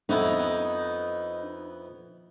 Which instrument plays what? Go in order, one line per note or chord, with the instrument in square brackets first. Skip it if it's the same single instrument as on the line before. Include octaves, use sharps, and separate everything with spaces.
[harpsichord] F2 B3 E4 [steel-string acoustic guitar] D#4